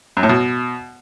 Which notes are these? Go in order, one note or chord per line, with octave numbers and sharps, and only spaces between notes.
F#2
A2
B2